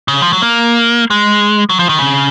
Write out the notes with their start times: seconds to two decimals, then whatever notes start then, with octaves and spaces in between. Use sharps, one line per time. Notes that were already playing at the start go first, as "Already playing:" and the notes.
0.08 C#3
0.22 F3
0.33 F#3
0.42 A#3
1.10 G#3
1.69 F#3
1.79 F3
1.89 D#3
1.98 C#3